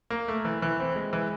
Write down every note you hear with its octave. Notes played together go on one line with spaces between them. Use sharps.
A#3
A3
E3
E3
C4
G#3
E3